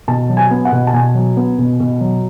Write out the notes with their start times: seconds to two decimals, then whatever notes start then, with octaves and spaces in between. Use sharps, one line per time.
0.08 B2 A5
0.29 F#3
0.37 G#5
0.51 B3
0.65 F#5
0.72 B2
0.87 A5
0.93 B2 G#5
1.15 F#3
1.37 B3
1.59 B2
1.80 B2
2.01 F#3